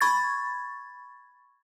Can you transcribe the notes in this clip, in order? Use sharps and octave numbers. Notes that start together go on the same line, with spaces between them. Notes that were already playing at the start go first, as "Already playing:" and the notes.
B5 C#6 G#6 A6